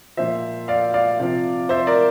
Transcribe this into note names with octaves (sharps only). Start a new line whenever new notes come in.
A#2 F3 C5 E5
D5 F5
D5 F5
C3 F3
C5 E5
A#4 D5